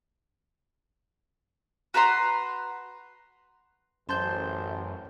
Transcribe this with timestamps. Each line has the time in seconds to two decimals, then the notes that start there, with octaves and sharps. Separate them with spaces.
1.94 F#4 B4 A#5 C6
4.09 A1 F#2 C#4 C5 A5 G6